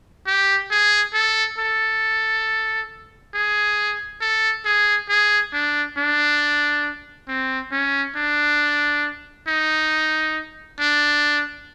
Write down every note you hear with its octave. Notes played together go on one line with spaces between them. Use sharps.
G4
G#4
A4
A4
G#4
A4
G#4
G#4
D4
D4
C4
C#4
D4
D#4
D4